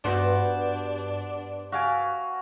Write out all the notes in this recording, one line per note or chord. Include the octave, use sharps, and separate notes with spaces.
G2 B3 D4 F#4 C5 F#5
F#4 E5 F5 G#5 A5 D6